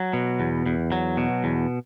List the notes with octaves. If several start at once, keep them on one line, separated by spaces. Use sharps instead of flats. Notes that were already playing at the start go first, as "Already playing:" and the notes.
Already playing: F#3
B2
E2
E2
F#3
B2
E2